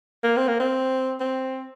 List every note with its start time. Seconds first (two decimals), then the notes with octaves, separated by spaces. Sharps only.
0.23 A#3
0.37 C4
0.48 A#3
0.60 C4
1.20 C4